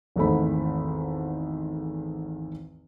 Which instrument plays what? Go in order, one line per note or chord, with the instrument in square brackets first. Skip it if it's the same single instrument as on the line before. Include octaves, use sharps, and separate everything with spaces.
[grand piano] G#1 E2 G#2 A3 C5 B5